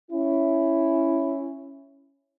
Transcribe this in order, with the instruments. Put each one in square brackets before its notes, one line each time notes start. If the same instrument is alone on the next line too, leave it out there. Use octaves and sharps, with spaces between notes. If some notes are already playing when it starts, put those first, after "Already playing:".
[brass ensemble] C#4 E4